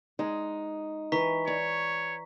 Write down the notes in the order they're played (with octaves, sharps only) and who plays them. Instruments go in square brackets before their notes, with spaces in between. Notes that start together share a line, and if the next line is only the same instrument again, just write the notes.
[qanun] G#3 [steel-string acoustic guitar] D#4
[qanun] E3 [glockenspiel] A#5 C#6 B6
[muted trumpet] C#5 [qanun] D5